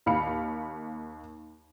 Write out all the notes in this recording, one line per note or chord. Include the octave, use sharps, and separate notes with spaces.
D#2 F5 B5 C#7